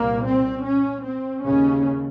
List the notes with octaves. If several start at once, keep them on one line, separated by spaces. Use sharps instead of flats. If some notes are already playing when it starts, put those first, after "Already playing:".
Already playing: C2 A#2 A#3
C4
C#4
C4
D#2 C#3 C#4